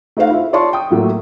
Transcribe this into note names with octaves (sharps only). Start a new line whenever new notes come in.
A3 D#4 A4 C5 F5 F#5
E4 F4 E5
F4 C#5 D5 A5 C6 C#6
G5 D#6
A2 F#3 A3 A#3